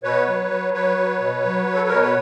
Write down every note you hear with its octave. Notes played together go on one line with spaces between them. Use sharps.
B2 B4 C#5
F#3
F#3
F#3 B4 C#5
F#3
B2
F#3
F#3
A4
B2 A#4
B4